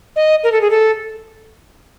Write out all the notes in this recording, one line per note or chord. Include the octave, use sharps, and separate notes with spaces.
D#5
A#4
A4
G#4
A4